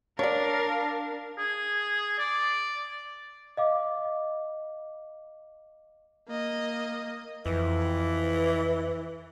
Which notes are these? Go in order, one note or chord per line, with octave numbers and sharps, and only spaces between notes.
D4 A#4 C#5 D5 F5
G#4
D5
D#5 F5 D6
A#3 D#5
F2 E3